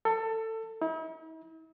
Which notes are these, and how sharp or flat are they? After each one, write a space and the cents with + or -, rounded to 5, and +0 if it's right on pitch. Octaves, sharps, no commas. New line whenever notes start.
A4 +20
E4 -45